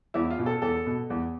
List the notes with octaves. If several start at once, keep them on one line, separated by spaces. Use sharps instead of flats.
E2 E4
F4
B2
A4
E2 A4
B2
E2